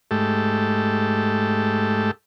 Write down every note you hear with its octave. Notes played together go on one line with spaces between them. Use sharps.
G#2 A3 G4 A4